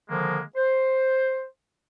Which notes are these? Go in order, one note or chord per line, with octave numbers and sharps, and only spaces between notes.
D3 D#3 F3 G#3 A#3
C5